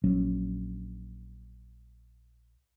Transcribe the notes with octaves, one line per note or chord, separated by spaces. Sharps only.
A#1 F#3 C#4